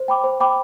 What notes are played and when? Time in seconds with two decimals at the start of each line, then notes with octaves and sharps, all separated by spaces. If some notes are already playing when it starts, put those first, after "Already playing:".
Already playing: C5
0.08 G5 B5 D6
0.24 C5
0.40 G5 B5 D6